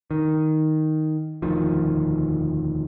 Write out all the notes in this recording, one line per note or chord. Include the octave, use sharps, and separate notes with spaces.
D#3
E1 D2 D#3 F3